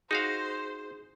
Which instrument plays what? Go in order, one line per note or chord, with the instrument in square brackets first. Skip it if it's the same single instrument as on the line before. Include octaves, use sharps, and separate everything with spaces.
[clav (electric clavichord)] D#4 F#4 F5 [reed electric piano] G#4 [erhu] C5